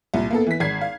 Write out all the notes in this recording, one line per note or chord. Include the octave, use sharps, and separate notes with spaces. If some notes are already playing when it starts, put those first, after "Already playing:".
C2 A#2
A#3 B3 A4
E3 B6
G#1 G#6 C7
F5